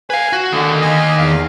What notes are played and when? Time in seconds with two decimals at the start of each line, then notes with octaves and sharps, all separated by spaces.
0.10 B4 F5 G#5
0.33 F#4
0.53 D3 D#3 A#3
0.81 D#5 G#5
1.18 E2 F5